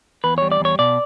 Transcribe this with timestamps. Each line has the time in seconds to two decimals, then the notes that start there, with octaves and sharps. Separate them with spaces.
0.24 E2 B4
0.38 G3 C#5
0.52 D5
0.60 E2 C#5
0.79 B2 D5